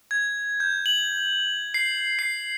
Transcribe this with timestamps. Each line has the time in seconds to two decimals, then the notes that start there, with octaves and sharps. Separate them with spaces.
0.11 G#6
0.60 G6
0.86 F#7
1.74 C7
2.19 C7